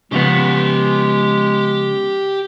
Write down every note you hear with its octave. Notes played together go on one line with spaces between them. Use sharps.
C#3 F3 G#3 B3 G4 F#5